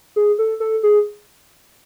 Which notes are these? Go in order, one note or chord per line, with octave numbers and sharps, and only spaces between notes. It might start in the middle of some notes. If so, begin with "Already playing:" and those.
G#4
A4
A4
G#4